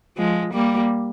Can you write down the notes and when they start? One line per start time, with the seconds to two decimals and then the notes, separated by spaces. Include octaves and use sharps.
0.17 F3 G#3
0.53 G3 A#3